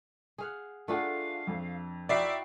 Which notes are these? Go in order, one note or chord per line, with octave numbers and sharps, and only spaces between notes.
G#4 F5 F#5
A3 D4 F4 G#4 F5 F#5
F2
D#4 E4 F#4 D5 E5 G5 C7